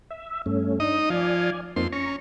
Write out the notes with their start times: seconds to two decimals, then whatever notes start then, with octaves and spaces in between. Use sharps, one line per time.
0.11 E5
0.46 G2 A3 C#4
0.80 D4 D#4 D#5
1.10 F3 D5 G#5
1.76 F2 A#3 C4 D#4 C6
1.92 C#4 A#5 C#6